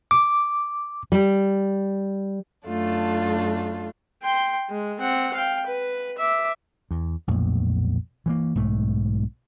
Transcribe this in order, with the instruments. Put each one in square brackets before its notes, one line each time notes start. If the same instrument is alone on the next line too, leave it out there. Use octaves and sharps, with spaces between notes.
[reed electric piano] D6
[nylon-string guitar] G3
[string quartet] F#2 A3 D4 F4
[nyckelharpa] G5 C6
G#3
C4 F#5
F5 G5
B4
E5 D6
[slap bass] E2
B1 F2 A#2 A3
E3 F#3 A#3
B1 G#2 A3